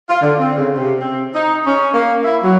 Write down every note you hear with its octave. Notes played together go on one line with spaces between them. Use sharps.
F4
D3
C4
C#3
C3
C4
D#4
C#4
A#3
E4
F#3